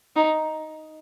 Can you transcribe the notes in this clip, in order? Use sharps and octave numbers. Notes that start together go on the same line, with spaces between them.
D#4